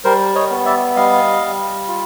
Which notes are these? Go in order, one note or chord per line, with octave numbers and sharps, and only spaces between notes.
G3 A#4 C5
C#5 D#5
B3
D5 E5
G3 D#5 F5
G3
F4